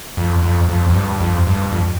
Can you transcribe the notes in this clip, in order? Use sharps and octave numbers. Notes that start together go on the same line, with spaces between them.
F2
F2
F2
F2
G2
F2
G2
F2